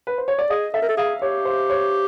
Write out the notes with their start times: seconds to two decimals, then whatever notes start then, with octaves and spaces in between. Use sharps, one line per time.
0.07 B4
0.18 C5
0.28 C#5
0.39 D5
0.50 G#4 D#5
0.74 A4 E5
0.82 A#4
0.89 A4
0.97 G#4 F5
1.22 G4 C#5
1.45 C5
1.70 C#5